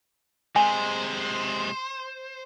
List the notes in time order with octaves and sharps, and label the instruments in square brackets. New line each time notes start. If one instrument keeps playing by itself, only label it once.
[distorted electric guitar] C3 G#3 [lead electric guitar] C5 [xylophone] G#5